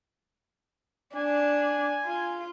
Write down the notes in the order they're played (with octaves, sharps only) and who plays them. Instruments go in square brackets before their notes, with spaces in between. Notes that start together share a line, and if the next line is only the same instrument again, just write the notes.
[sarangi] D4 [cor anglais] G#5
[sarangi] F4